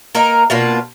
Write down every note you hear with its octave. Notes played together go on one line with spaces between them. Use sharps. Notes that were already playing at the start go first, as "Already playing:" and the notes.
A#3 D#4 A#4
B2 A#3 D4 F4